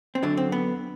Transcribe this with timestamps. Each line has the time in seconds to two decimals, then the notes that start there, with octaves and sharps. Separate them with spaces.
0.15 C4
0.22 F#2 D3 F#3 D4
0.37 C4
0.52 B3